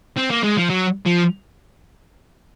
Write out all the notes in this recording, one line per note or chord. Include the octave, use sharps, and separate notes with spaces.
C4
A#3
G#3
F3
F#3
F3